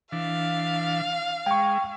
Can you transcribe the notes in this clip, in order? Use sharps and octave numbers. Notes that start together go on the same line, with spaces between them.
E3 D4 F5
G#3 G5 C#6